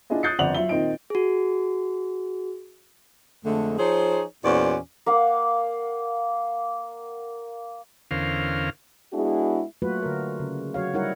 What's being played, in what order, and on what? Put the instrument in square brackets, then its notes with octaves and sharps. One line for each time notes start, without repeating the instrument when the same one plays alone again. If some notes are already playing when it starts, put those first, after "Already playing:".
[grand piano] D4 E4 F4 G#4 D#5 E5
D#6 F#6 G6 A6 C7 C#7
G1 F2 D5 F#5 F7 F#7
F#3 F4 E5 G7
A#2 D#3 C4 D#4 D#5 D7
[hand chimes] F#4 G#4
[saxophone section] F2 D3 G#3 A3
F3 D#4 G#4 C5 C#5
E2 A#2 C#4 F#4 C5 D5
[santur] A#3 F5 F#5
[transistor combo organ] E2 D3 C#4 A#4 C5 F5
[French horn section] G#3 B3 D4 E4 F#4 G#4
[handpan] F#3 A3 A#3 F4 F#4 B4
D3 A#4
C#3
F#3 F#4 C#5 F5
G3 D#4 E4 A#4 C#5 F#5